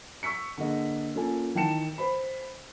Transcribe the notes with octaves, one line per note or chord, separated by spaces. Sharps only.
C#6 E6 B6 C#7
D3 A#3 G#4 D#5
A#3 C#4 F4 A4 G#5
D#3 E3 G5 A5 C#7 E7
B4 C5 B5